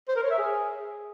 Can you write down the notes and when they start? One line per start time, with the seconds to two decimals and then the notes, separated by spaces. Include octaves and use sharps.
0.08 C5
0.16 A#4
0.23 C#5
0.31 E5
0.38 G#4